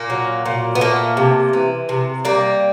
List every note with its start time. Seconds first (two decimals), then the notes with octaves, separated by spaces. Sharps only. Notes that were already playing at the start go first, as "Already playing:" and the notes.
Already playing: A#2 A#3
0.10 F#3
0.46 A#2
0.75 B3
0.81 A3 A#3
1.17 C3
1.53 E3
1.89 C3
2.25 G3 A#3